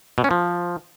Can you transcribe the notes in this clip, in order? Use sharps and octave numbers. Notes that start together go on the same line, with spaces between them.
B2
C#4
F3